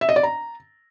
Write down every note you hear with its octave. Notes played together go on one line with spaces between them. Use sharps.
E5
D#5
D5
A#5